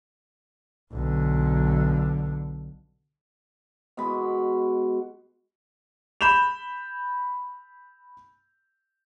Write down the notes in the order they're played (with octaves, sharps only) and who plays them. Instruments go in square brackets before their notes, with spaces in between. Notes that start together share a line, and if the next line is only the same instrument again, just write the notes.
[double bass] B1 D3
[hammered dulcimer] B2 G#3 B5
[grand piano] B5 G6 E7 F7